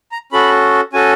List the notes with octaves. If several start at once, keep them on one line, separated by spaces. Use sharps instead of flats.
A#5
C#4 F#4 A4 B5
C#4 F#4 A4 G#5